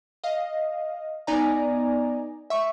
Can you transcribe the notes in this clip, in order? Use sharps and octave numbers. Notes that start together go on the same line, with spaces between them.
D#5 F5
B3 D#4 D5 G#5 A#5
E5 C#6